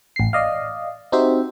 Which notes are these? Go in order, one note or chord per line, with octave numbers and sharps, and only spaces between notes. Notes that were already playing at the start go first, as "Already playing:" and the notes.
A1 C7
D5 D#5 F5
C4 D#4 F#4 G4 C5 E5